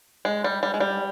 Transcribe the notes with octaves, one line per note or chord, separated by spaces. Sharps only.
G#3
G3
G3
G#3
G3